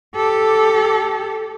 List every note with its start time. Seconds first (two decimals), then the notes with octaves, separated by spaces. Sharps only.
0.15 G4 A4